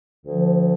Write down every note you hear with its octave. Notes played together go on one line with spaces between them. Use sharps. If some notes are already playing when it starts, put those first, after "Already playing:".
D2 D3 F3